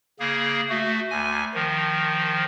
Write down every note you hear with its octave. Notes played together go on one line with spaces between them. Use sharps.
C#3 A#3 G#4
A3 F#4
D2 G#5
D#3 F3